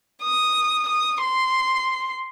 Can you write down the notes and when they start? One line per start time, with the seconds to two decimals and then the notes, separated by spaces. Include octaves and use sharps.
0.22 D#6
0.88 D#6
1.22 C6